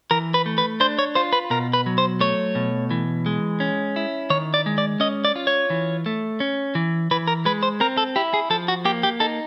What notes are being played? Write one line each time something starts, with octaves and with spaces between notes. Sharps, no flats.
E3 A#4
B4
A3
B4
D4 C5
C#5
F4 C5
B4
B2 A#4
B4
F#3
C5
A3 C#5
B2
E3
G#3
C#4
E4
D#3 C#5
D5
G#3
D5
C#4 D#5
D5
F4
C#5
E3
A3
C#4
E3
E3 B4
A#4
G#3 B4
C5
C4 A#4
A4
E4 G4
G#4
F3 A4
F#4
A#3 G4
G4
D#4 A4